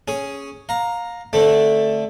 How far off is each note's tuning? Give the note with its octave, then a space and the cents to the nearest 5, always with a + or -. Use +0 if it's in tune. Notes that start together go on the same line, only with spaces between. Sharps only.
C#4 +0 G#4 +0
F5 +25 A#5 +0
D3 +0 A3 +0 C4 +30